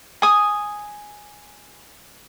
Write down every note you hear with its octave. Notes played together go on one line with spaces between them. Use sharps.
G#5 D#6